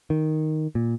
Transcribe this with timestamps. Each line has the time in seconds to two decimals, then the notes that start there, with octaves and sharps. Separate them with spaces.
0.10 D#3
0.75 A#2